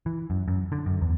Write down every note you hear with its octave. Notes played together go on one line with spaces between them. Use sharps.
E3
F#2
F#2
D3
F#2
E2